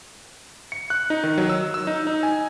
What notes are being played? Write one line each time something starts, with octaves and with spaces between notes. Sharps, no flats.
C#7
F#6
D#4
D#3
F#3
E6
E6
D#4
D#4
G#5